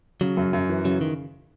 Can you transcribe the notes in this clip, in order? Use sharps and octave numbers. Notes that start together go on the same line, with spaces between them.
C#3 F#3
F#2
F#2
E3
C#3 F#3
D#3